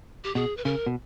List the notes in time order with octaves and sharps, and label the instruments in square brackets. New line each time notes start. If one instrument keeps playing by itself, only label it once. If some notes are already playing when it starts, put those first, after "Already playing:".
[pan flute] G4
[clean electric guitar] B2 [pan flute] G#4
[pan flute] B4
[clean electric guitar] C#3 [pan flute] A#4
[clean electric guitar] B2